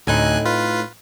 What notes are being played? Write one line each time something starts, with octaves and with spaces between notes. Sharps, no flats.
D2 A2 C4 D#4 G#5 F#6
F4 B4